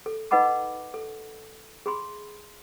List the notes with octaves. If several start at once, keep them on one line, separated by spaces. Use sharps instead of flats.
A4
D#4 B4 D#5 F#5 B5 D6
A4
G#4 B5 C6